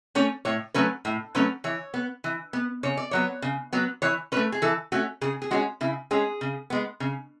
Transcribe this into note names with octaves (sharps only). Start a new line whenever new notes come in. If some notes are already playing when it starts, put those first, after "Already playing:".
A3 C#4 C#5
A2 C#5
F#3 A3 C#4 B4
A2
F#3 A3 C#4 B4
E3 C#5
B3
E3
B3
C#3 C#5
D5
F#3 B3 C#5
C#3
F#3 B3
E3 C#5
A3 C#4 B4
G#4
E3 A4
A3 C#4 F#4
C#3 G#4
G#4
G#3 C#4 F#4
C#3 E4
G#3 C#4 G#4
C#3
G#3 B3
C#3